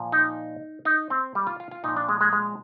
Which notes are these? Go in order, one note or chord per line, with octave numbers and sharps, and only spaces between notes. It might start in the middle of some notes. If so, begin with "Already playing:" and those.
Already playing: A#2 F3
D#4
D#4
C4
G3
F4
F4
F4
A#2 F3 D#4
D4
G#3
G#3
G#3